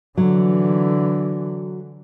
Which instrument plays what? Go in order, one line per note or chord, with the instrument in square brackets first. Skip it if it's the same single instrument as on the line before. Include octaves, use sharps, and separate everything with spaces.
[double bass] D3 E3 [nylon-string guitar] F#3